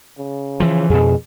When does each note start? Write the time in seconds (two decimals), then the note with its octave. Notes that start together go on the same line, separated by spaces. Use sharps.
0.18 C#3
0.60 E3 F3
0.90 F2 B2 G#4